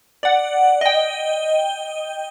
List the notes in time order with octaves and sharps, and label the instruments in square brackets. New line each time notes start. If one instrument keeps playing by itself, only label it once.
[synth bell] D5 F#5
D#5 G5